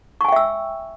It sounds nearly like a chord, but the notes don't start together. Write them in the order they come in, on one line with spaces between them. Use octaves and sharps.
C#6 G#5 G5 E5 E6